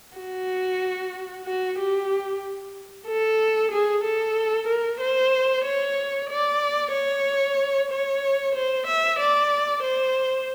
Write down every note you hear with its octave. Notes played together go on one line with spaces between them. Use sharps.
F#4
F#4
G4
A4
G#4
A4
A#4
C5
C#5
D5
C#5
C#5
C5
E5
D5
C5